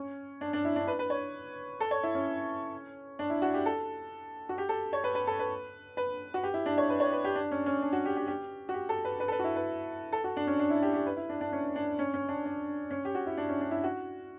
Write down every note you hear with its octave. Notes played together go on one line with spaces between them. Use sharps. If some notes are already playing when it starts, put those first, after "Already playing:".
Already playing: C#4
D4
D4
E4
D4
B4
B4
C#5
A4
C#5
E4
C#4
D4
E4
F#4
G4
A4
F#4
G4
A4
C#5
B4
B4
A4
B4
B4
F#4
G4
E4
D4
C#5
B4
C#5
B4
G4
D4
C#4
C#4
D4
F#4
G4
G4
G4
F#4
G4
A4
B4
B4
A4
B4
F#4
E4
B4
A4
F#4
D4
C#4
D4
E4
G4
G4
B4
E4
D4
D4
C#4
D4
C#4
C#4
D4
D4
C#4
G4
F#4
E4
D4
C#4
D4
E4
F#4